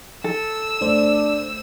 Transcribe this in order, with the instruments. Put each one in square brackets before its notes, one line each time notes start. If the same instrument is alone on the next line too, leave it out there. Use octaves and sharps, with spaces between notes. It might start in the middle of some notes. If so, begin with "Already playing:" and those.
[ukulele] A4 [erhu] E6
[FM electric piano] G1 A3 C5 [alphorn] D4